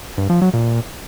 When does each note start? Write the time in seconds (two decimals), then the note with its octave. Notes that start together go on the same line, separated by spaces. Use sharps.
0.18 G2
0.30 F3
0.42 F#3
0.53 A#2